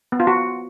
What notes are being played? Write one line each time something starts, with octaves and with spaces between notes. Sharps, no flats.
B3
F4
F#4